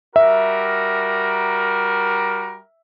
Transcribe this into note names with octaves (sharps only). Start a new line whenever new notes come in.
G3 F#4 A#4 E5